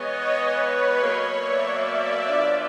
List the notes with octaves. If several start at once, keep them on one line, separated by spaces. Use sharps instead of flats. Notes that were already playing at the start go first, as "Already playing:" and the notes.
Already playing: E3 G#3 B3 C#5 D#5
B4 C#5
B2 F#3 A#3 C#5 D#5
D5 E5
D5 E5
B2 F#3 B3 D4 F4 D5 E5